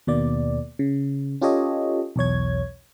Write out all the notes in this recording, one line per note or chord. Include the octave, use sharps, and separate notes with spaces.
D#2 B2 A#3 D5
C#3
C#4 F4 G4 A4 C#5 D#5
B1 E2 C#5 G#6